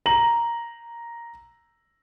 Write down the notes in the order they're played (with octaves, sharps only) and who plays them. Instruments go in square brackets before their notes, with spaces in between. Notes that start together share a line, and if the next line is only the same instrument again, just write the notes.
[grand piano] A#5 F#7